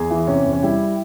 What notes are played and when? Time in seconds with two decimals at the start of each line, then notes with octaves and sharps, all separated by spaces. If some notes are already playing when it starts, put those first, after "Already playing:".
Already playing: E2 G#4
0.10 E3
0.27 C3 C#4
0.45 E2
0.53 C#4
0.62 G3 E4